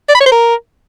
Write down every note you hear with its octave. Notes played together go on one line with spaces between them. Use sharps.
D5
B5
C#5
C5
A#4